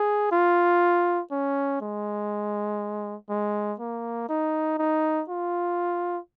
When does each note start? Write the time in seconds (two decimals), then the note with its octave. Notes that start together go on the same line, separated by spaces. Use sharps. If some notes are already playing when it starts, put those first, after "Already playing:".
Already playing: G#4
0.32 F4
1.31 C#4
1.81 G#3
3.30 G#3
3.80 A#3
4.29 D#4
4.78 D#4
5.29 F4